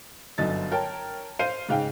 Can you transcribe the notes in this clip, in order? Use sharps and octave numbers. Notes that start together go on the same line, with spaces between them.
G1 F#2 D3 D#5 A6
A#4 C#5 G5 A5 A#5
C5 F5 C7 D#7
G#2 C#3 F5 G5